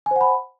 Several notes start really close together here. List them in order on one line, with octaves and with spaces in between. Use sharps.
G#5 C5 F#5 B5